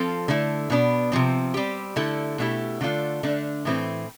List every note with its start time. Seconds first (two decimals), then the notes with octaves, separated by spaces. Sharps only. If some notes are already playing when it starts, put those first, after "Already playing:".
Already playing: F3 C4 F4 A4
0.28 D3 A3 E4
0.70 B2 B3 D4
1.12 C3 F3 C4
1.54 G3 C4 G4
1.96 D3 A3 E4 A4
2.38 B2 A3 E4 G4
2.81 D3 A3 D4 F4 A4
3.23 D3 A3 D4
3.65 A2 E3 A3 C4